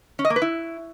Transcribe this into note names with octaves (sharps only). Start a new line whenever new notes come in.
C#4
D#5
A#3
B4
E4